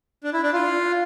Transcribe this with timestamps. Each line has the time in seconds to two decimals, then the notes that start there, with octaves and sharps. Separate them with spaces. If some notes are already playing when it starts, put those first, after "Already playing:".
0.24 D4
0.33 E4
0.43 D4
0.53 F4